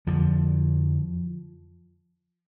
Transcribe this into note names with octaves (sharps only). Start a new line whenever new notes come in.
F2 D3 F3